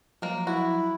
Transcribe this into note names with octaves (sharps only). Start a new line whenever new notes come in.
F3 F#3 G#3 A#3
E4 F#4